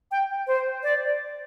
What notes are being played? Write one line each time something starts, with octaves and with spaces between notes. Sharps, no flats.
G5
C5
D5